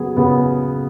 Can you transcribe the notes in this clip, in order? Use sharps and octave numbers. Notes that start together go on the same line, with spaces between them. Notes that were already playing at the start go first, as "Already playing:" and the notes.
Already playing: F#3 B3 G#4
C#3 B3